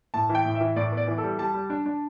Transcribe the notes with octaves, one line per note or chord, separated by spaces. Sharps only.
A2 A5
E3
G5
A2
E5
E3
A2 D5
B3
D5
E3
A4
G3
G3 A5
G3
D4
D4